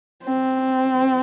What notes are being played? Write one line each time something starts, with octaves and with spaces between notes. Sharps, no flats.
C4